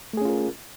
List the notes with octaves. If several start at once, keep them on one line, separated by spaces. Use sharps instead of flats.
A3 C#4 F4 G#4 A#4